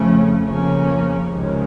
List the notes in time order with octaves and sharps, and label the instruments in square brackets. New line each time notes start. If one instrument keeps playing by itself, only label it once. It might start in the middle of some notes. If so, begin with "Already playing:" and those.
Already playing: [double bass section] F2 C#3 F3 A3 C#4
F2 C#3 F3 A#3 C#4
C#2 C3 D#3 G#3 C#4